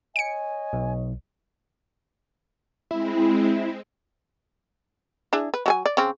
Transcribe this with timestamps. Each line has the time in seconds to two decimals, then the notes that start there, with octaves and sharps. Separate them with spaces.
0.16 C#5 D#5 G#5 C#7 D7
0.73 B1
2.91 G#3 C4 E4
5.33 D4 E4 G#4
5.54 B4
5.66 F#3 G#4 G#5
5.86 D5
5.97 C#3 C4